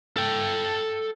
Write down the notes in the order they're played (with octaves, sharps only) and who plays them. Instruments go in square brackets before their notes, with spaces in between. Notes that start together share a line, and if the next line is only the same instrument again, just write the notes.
[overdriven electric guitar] A4 G5